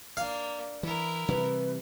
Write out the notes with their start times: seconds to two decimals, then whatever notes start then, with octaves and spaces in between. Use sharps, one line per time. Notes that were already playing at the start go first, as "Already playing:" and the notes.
0.17 A#3 D4 F5
0.83 E3 E4 A#4
1.28 C3 E3 G3 B4